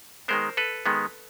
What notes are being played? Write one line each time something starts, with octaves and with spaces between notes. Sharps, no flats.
D#3 G#3 B3 A#4 C5
A4 B4
D#3 G#3 B3